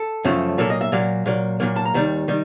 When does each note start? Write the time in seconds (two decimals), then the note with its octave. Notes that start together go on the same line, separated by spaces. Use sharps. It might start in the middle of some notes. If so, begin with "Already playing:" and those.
Already playing: A4
0.25 F#2 C#3 F3 A3
0.58 A#2 F#3 A#3 A4
0.70 D#5
0.81 E5
0.92 A#2 F#3 A#3 F5
1.26 A#2 F#3 A#3
1.60 A#2 F#3 A#3
1.76 A5
1.85 A#5
1.94 D#2 D#3 G3
2.28 D#3 G3